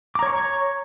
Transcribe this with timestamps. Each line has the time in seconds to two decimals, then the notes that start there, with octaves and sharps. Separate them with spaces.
0.15 D6
0.19 A#5
0.23 C#5
0.26 C#6